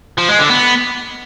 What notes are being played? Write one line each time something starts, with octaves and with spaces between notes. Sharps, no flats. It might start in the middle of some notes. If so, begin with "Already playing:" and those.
F3
G#3
D3
B3